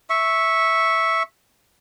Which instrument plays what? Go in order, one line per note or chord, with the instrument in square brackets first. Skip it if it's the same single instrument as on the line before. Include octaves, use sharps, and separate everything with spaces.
[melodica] E5 C#6